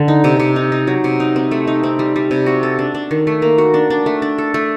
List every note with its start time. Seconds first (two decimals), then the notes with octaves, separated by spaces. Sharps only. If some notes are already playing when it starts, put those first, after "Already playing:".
Already playing: D3
0.08 D#4
0.24 C3
0.40 C3
0.56 D#4
0.72 D#4
0.87 F#3
1.04 C3
1.20 D#4
1.36 C4
1.51 A3
1.67 D#4
1.83 C4
1.99 G3
2.16 G3
2.31 C3
2.46 F#4
2.63 A4
2.79 D4
2.95 D4
3.11 D#3
3.27 A3
3.42 A#3
3.58 F#4
3.74 D4
3.90 D4
4.06 A3
4.22 D4
4.38 A4
4.54 A3